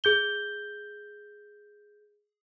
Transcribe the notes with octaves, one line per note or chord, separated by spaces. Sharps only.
G#4 G6 G7